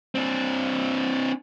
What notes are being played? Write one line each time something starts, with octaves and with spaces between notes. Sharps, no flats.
C4 D4